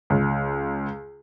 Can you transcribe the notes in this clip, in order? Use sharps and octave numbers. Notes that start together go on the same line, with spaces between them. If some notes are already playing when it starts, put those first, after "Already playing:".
C#2